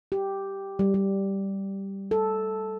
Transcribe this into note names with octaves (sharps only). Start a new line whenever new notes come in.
G4
G3
G3
A4